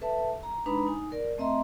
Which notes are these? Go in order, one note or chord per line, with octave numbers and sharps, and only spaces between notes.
A4 B4 E5 A5
A#5
G#3 D4 D#4 B4 A#5 B5
D#4 G#5
A#4 D5
A3 C4 D#5 E5 A#5 C6